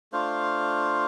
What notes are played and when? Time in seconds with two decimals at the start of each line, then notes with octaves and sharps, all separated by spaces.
0.12 A3 D4 F4 C5 F5